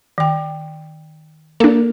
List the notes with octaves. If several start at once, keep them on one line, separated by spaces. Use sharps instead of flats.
D#3 G5
A#3 D4 A4